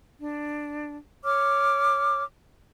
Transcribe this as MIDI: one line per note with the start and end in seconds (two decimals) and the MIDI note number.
0.20 0.96 62
1.24 2.23 73
1.24 2.23 86
1.24 2.23 89